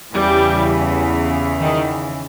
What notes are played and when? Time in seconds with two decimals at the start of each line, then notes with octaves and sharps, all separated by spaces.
0.13 E2 C#3 E3 G3
1.61 D#3